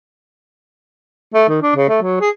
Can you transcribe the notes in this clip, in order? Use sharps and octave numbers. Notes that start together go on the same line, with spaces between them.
A3
D#3
D4
C#3
A3
F#3
G#4